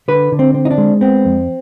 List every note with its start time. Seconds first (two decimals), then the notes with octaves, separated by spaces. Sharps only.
0.08 D3 B4
0.32 D3
0.39 C4
0.54 C4
0.65 D#4
0.71 D4
0.78 G#3
1.01 B3 C4
1.25 F2